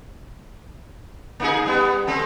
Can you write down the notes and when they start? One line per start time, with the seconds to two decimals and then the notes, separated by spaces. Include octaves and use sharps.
1.40 A#3 D#4 G#4
1.66 G3 B3
2.07 A3 C4 A4